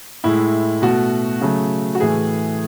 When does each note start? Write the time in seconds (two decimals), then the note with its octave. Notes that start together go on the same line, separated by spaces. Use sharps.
0.24 A2 G#3 E4
0.82 B2 A3 F#4
1.41 C#3 F#3 A3
1.95 F#4
2.00 A2 E3 A3 G#4